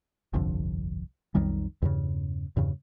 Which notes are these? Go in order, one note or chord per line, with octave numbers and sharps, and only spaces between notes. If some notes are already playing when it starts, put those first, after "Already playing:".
G1 C2 F2 D3
B1 F2 D#3 G3
E2 G2 C#3
E2 G2 C#3